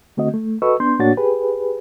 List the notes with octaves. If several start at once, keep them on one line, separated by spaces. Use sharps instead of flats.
D3 A3 C4 F#4 D#5
A3
F#4 A4 B4 D#5 C#6 E6
B3 D4 C6 G6
A2 A#3 D4 F#4 C#5 A6
G4 G#4 B4